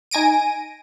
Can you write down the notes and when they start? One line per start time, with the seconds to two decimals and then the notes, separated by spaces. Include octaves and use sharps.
0.11 D#4 G#5 A#6 D7 D#7